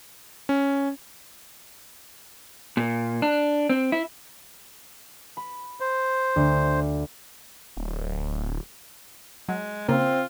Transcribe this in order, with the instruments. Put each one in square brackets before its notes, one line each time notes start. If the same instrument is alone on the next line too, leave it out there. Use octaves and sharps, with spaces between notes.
[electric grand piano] C#4
[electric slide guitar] A#2
D4
C4
E4
[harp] B5
[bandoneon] C5
[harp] D2
[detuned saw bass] D1
[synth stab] F#3 [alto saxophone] G#3
[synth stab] C#3 A#3 [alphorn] C4 [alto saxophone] F4